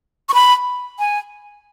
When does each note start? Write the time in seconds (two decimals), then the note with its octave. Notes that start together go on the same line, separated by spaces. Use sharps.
0.29 C#6
0.34 B5
0.99 G#5